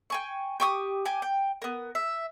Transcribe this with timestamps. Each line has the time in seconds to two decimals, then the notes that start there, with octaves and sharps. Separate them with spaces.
0.10 G5 G#5 C#6
0.60 G4 C#6 D#6
1.05 G4 G#5 D6
1.22 G5
1.62 B3 A#4
1.95 E5